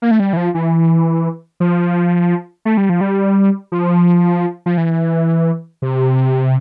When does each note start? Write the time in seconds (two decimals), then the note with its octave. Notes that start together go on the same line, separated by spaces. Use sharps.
0.02 A#3
0.11 A3
0.20 G3
0.33 E3
0.37 F3
0.55 E3
1.60 F3
2.65 A3
2.77 G3
2.89 F3
3.01 G3
3.72 F3
4.66 F3
4.78 E3
5.82 C3